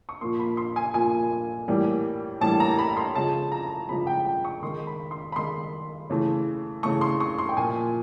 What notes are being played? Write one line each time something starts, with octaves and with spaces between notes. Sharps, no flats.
C#6
A#2 F3 A#3 C6
B5
C6
G#5
A#2 F3 A#3 G#5
A2 E3 G3 A#3
A2 E3 G3 A#3 A5
A#5
B5
C6
C#3 F3 G#3 A5
A#5
C#3 F3 G#3 B5
G5
G5
C#6
D#3 G#3 C6
B5
C6
B5
D#3 G#3 C6
C#3 E3 A3
C#3 E3 A3 C#6
C6
C#6
C6
G5
A#2 F3 A#3 G#5